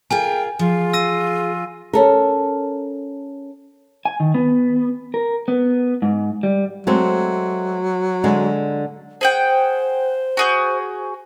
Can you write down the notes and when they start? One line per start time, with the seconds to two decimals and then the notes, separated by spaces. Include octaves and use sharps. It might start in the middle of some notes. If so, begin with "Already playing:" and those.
0.11 F4 G#4 A#4 G5 G#5
0.59 F3 F4 G#4
0.93 E6 A#6 D#7
1.93 C#4 A4 A#4
4.05 G#5
4.20 D#3
4.35 B3
5.14 A#4
5.48 B3
6.02 G#2
6.43 G3
6.87 F#3 G#3 A3 C4
8.24 D3 G#3
9.21 G#4 C5 F#5 G5
10.37 F#4 G#4 G6